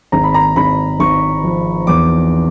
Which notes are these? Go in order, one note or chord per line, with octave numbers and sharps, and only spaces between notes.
G#1 A#5
B5
A#5
G#1 B5
G#1 C#6
F3
E2 D6